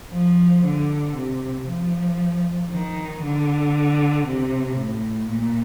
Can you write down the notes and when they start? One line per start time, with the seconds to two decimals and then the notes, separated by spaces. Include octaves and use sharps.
0.13 F3
0.65 D3
1.16 C3
1.68 F3
2.71 D#3
3.23 D3
4.27 C3
4.79 A2
5.30 A#2